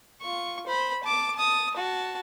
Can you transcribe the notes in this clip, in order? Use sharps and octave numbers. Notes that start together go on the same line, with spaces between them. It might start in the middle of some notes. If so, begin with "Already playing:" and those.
F4 C#6
C5 B5
A5 D6
A5 D#6
F#4 A5